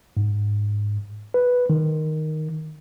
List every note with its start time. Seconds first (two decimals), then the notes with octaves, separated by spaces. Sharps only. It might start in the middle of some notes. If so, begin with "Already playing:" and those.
0.17 G#2
1.34 B4
1.70 D#3